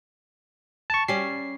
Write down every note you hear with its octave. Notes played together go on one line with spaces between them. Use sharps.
A5 C#6
G3 C#4 C7